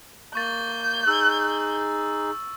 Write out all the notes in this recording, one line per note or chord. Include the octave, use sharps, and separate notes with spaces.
A#3 C#6 G6 A6
D#4 G#4 E6